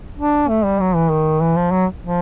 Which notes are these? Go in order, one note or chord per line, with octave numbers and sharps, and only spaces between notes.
D4
A3
G3
F#3
E3
D#3
E3
F3
F#3
F3